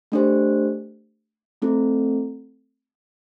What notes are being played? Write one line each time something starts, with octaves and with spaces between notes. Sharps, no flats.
A3 D4 G4 C5
A3 C4 E4 A4